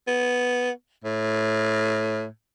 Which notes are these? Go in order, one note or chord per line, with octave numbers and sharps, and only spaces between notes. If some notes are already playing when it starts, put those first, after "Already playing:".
B3
A2